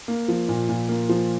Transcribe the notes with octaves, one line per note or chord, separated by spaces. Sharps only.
A#3
F3
A#2
A#2
A#3
F3